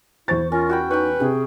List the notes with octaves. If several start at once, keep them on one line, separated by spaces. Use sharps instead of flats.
E2 E4 C5 C#6 A6
C#4 F4 A#4
F#4 G5 B5
D#4 B4 C#5 G5
C3 G4 G#4